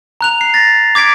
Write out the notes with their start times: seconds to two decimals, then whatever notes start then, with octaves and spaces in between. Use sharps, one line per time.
0.21 A#5 F#6 F7
0.41 C7
0.54 A6 A#6
0.95 D6 G#6 B6 D7